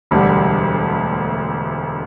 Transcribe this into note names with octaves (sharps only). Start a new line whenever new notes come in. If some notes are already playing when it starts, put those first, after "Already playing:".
E1 D2 D3 G3